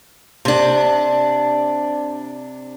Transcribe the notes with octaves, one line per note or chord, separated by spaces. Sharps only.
C3 D4